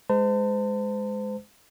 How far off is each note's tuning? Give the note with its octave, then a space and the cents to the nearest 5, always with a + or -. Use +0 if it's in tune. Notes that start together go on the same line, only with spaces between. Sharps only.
G#3 +0 C5 -35 A5 +35